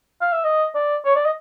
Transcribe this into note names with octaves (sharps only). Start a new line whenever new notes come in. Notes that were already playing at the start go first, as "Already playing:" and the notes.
F5
E5
D#5
D5
C#5
D5
D#5